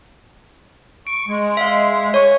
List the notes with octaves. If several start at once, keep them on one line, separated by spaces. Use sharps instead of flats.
C#6 D7
G#3
E5 F5
C#5 C#6